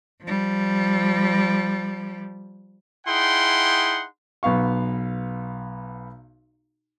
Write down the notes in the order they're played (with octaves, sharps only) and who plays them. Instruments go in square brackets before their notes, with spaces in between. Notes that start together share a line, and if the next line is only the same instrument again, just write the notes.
[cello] F3 G3
[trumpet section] D#4 E4 G#4 F#5 G5 C6
[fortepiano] B1 B3 F5 C#6